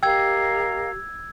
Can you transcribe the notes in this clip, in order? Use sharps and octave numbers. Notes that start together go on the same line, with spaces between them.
G4 A#4 D#5 F5 G5 E6 G#6